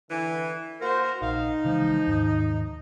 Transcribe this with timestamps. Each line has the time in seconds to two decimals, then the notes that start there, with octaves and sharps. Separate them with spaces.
0.11 D3 E3
0.81 A#3 F#4 A#4 C5
1.22 A#1 D#4 F5
1.65 C#3 E3 F3 G#3
2.07 D#2 G#2 D#3